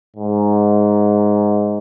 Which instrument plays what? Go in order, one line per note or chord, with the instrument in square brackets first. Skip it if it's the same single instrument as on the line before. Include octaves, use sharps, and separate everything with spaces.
[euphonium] G#2